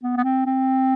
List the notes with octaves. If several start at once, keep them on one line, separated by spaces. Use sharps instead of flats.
B3
B3
C4
C4